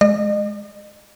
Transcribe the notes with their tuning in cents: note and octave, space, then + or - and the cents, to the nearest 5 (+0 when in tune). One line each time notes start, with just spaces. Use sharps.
G#3 +15 D#5 -40